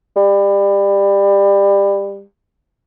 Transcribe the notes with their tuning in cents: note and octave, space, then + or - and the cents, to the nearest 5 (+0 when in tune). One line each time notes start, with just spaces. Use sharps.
G3 +25